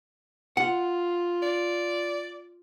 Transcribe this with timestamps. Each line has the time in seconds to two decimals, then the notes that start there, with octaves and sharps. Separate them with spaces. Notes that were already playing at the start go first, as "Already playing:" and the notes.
0.57 F4 F#5
1.43 D5